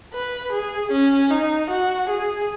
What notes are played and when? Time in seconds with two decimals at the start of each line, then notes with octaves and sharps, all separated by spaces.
0.14 B4
0.53 G#4
0.92 C#4
1.31 D#4
1.70 F#4
2.10 G#4